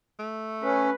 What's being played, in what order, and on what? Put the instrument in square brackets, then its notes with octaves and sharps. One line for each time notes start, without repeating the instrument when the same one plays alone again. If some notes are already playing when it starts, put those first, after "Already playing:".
[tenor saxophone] A3
[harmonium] C#4 [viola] B4